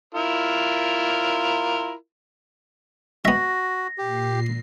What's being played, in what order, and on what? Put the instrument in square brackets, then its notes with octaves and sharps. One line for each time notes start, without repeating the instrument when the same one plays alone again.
[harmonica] E4 F4 A#4
[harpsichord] B3 E5 [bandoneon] F#4 [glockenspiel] A#6
[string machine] A#2 C7 [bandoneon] G4